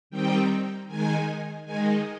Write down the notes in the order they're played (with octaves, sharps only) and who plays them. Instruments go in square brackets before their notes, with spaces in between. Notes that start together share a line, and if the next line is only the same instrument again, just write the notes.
[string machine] D#3 G3 C4 D#4 G5
D#3 G#3 D#4 G#5
D#3 G#3 D#4 G#5